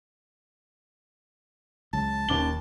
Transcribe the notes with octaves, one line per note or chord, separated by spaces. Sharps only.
C#2 F#3 A5
D#1 D#2 C#4 D6 G7